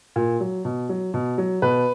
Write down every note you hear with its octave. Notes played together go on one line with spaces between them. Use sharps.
A#2
F#3
B2
F#3
B2
F#3
B2 B4